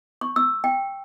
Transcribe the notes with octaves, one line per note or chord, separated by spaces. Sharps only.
C#6
E6
G5